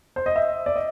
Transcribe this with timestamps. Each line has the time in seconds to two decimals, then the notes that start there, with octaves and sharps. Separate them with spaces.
0.16 C5
0.26 D#5
0.36 E5
0.66 D5
0.76 D#5